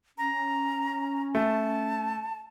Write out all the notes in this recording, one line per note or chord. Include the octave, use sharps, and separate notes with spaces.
C#4 A#5
A3 A5